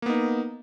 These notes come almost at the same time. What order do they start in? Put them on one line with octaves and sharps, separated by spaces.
A#3 B3 D#4